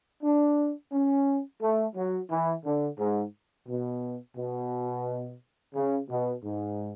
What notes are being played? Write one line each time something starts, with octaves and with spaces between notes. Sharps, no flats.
D4
C#4
A3
F#3
E3
D3
G#2
B2
B2
C#3
B2
G#2